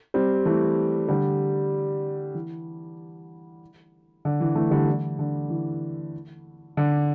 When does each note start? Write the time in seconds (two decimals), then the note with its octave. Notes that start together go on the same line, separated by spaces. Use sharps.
0.14 G3 C4
0.45 E3 A3
1.08 D3 G3
2.35 E3
4.25 D3
4.41 E3
4.55 E3 A3
4.71 D3 G3
4.88 E3
5.19 D3
5.50 E3
6.77 D3